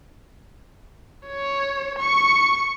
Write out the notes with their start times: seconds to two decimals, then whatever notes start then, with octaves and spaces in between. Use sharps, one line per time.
1.27 C#5
1.99 C#6 C#7